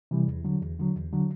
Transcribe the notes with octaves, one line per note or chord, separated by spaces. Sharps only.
C3 E3 G3
E2
D3 F#3
E2
D3 F#3
E2
D3 F#3